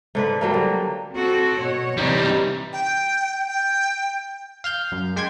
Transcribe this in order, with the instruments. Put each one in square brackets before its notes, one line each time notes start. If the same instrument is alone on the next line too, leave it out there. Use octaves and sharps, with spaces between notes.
[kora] G#2 D3 B4
F#3 G3 A#3
D3
[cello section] C4 F#4 A4
B2 C#5
[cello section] C3 E3 [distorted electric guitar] G3 D#4
[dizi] G5
G5
[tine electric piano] F5 F6 G6
F#2
G#3 G5 C6 G#6